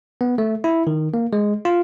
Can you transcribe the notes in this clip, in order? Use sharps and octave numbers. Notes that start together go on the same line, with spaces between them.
B3
A3
E4
D#3
A#3
G#3
F4